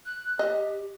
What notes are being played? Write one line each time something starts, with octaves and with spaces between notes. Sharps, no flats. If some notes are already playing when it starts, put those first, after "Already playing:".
F#6
G4 D#5